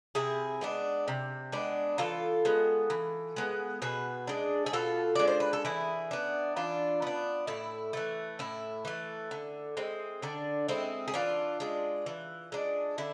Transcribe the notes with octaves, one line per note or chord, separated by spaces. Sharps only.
C3 E4 G#4
G#3 B3 D4
C3
G#3 B3 D4
E3 F4 A4
G#3 B3
E3
G#3 B3
B2 G#4 B4
G#3 D4
G#4
B2 F4 A4
G#3 D4 D5
C5
B4
A4
E3 E4 G#4
B3 D4
E3 D4 F4
B3 D4
A2 E4
E3 A3
A2 E4
E3 A3
D3
G#3 C4
D3 D4
G#3 C4 E4
G#4
E3 D4 F4
G#3 D4
E3
G#3 D4
D3 E4